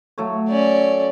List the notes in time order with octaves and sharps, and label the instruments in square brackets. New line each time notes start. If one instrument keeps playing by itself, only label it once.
[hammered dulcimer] F#3 A3 C#5
[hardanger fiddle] C#4 D5